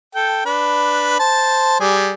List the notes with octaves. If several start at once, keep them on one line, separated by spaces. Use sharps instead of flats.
A4 G5
D4 B4
C5 A5
G3 G#4